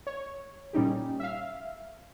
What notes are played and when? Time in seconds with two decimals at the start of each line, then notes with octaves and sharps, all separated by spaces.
0.07 C#5
0.73 A#2 G3 C#4 D#4 G4
1.20 E5 F5